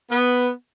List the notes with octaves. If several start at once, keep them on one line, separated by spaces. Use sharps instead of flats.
B3